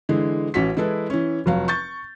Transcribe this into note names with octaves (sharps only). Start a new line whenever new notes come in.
D3 E3 G#3
A1 C#4 F#4 B6
E3 G#3 E4 A4 B4
E3 C#4
F1 F#3 F5
C#6 G6 A6